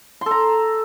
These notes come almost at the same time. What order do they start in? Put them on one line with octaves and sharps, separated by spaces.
C6 A4 A#5